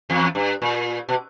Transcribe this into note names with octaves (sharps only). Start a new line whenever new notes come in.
E2
G2
A#2
B2